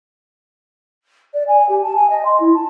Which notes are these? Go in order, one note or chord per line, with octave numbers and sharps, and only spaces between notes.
D5
G#5
G4
A5
G#5
D#5
C6
E4
A5